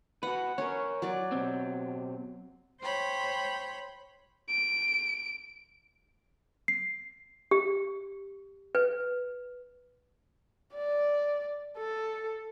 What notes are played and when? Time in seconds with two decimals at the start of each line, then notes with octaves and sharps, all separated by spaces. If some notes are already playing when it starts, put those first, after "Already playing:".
0.23 F#4 B4 F#5
0.58 C#4 A#4 C#5
1.02 F#3 D5
1.32 B2 C4
2.82 C5 C#5 G5 B5
4.49 D7
6.68 C7
7.51 G4
8.75 B4
10.74 D5
11.78 A4